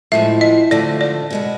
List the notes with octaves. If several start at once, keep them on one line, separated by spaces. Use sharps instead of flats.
A2 F3 G#3 E5
D#5
D3 F3 A3 D4 D5
D5
B2 G#3 B3